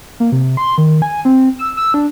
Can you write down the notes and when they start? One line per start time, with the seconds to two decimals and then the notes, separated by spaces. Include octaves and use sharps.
0.20 A#3
0.32 C3
0.57 C6
0.78 D#3
1.02 G#5
1.25 C4
1.59 E6
1.77 E6
1.94 D4